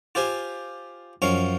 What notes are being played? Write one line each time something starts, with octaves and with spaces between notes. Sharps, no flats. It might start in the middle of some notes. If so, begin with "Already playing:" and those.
F4 G4 C5 G#5
F#2 F3 C#4 F5